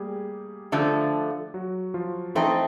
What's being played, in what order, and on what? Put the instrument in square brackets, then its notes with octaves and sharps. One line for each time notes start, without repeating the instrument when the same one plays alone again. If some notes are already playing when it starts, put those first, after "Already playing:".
Already playing: [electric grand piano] G3 A3 A#3 G4 G#4
[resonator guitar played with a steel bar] D3 F3 A3
[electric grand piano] F#3 F#4
F3 F4
[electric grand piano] E3 E4 [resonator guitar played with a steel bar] A3 C4 D#4